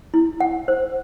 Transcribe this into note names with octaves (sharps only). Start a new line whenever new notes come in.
E4
F#5
C5